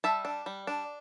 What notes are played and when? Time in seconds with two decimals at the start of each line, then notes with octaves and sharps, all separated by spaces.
0.04 G3 E5 A5
0.25 D4
0.46 G3
0.67 D4